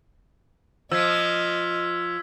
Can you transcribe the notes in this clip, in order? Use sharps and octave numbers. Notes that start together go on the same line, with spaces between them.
F3 D#5 E6 G#6 B6